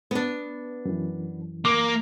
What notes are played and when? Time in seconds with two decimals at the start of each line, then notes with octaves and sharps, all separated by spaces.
0.11 B3 D4
0.85 F#2 E3
1.65 A#3 D6